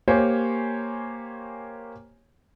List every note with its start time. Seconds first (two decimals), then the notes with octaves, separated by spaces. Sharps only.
0.08 A#3 G4 C5 C#5 G#5